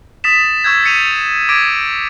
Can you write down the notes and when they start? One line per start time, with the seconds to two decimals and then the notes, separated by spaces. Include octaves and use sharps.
0.24 D#6 A6 B6 E7
0.64 C#6 E6 G6 G#6
0.84 A6 C7 C#7 D#7 F7
1.49 D6 G#6 A#6 D7